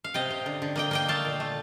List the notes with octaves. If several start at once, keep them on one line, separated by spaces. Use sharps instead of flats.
F5
C3 D#5 G5
C3
D3
D3
A#3 D#5 G5
A#3 D#5 G5
A3 F5 A5
A#2
A3